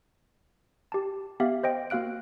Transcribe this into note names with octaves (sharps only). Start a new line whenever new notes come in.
G4 A5
B3 G4 E5 F5
C5 D#5 G5
A#3 F#4 F5 F#6 D7